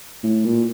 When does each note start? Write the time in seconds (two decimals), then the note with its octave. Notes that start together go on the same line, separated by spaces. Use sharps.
0.23 A2
0.45 A#2